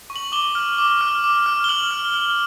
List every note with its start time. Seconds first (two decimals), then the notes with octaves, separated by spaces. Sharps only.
0.10 C#6
0.16 F#7
0.32 D6 G7
0.55 F6
0.78 D6
1.01 F6
1.24 D6
1.46 F6
1.64 G7
1.69 F6 F#7
1.91 F6
2.14 F6